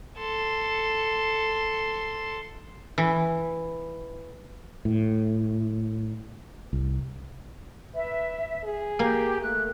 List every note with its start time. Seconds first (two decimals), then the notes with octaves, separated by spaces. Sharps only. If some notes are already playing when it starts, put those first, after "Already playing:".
0.17 A4 C6
2.98 E3
4.85 A2
6.73 C2
7.95 B4 E5
8.64 G#4
8.99 A#3 G4
9.41 A3 F#6